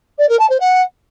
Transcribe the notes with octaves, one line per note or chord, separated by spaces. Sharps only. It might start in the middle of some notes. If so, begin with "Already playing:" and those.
D5
A#4
A5
C5
F#5